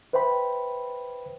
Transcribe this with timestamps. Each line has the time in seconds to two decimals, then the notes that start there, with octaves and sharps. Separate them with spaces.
0.13 B4 C5 E5 G5 B5